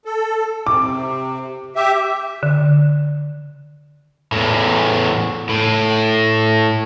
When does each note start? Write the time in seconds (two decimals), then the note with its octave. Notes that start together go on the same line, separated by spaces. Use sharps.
0.05 A4
0.67 C3 D6
1.76 G4 E5
2.43 D3
4.32 E2 A2
5.49 A2